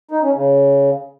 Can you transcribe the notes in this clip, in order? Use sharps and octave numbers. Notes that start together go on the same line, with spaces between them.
D#4
C#4
C#3